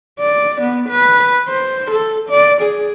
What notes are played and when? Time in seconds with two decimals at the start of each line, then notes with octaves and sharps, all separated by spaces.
0.20 D5
0.61 B3
0.90 B4
1.48 C5
1.91 A4
2.30 D5
2.62 G#4